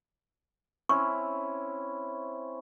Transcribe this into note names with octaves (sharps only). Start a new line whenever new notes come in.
C4 C#4 E4 C#6